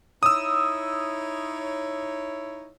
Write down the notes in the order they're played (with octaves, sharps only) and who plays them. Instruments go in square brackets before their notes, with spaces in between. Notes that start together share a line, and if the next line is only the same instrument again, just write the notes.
[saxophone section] D#4 E4 C#5 [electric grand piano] D#6 E6